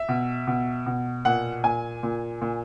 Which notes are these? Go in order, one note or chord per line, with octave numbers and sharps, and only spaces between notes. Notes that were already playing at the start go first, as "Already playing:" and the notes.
Already playing: E5
B2
B2
B2
A#2 F#5
A#2 G#5
A#2
A#2